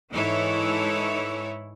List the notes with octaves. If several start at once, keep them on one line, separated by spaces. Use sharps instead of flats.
G#2 E3 D#4 E4 A4 C#5